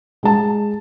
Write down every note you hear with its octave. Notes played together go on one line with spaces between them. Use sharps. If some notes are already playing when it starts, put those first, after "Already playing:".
G#3 A5